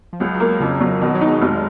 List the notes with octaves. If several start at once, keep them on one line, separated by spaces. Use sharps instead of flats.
F3
C#2 F#3
F#3
A#3
F2 C#3
F#3
B2 D#3
F#3
D#4
G#3
F1